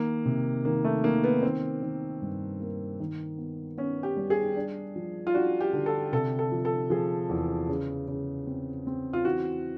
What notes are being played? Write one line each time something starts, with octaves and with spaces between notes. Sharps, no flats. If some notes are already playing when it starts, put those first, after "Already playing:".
Already playing: D#3 A#3
C3
D#3 A#3
A3
D#3 A#3
B3
D#3 C4
D#3
G2
A#3
D#3
B3
B3 C#4
G4
G3
G#4
D4
F3
F4
D4 F#4
G4
D3
A4
C3 A4
A4
F3
A4
F3 G#4
E2
C#3
C#3
C4
C4
F4
E3 F#4